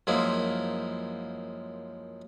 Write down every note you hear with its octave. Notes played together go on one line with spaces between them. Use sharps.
F#2 F3 G#3 A#3 E4